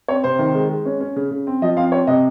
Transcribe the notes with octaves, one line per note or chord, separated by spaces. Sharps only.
C4 C#5
C3 C5
D#3
G#3
G#3
C#4
C#4
C#3
C#3
C4
F3 D#5
C4 F5
C4 C#5
C3 D#5